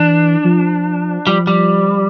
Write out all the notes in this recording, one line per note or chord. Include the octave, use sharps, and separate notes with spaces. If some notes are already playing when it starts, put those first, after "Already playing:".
Already playing: E3 D4
F3
F3 G3
G3